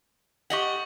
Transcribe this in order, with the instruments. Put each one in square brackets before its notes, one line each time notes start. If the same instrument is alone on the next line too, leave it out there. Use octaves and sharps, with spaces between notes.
[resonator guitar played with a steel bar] G4 D#5 F#5 [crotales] C#6 F#7